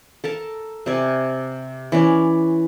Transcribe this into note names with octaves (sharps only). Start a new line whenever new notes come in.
A4 A#4 A5
C3 D5 G#5
E3 C#4 D5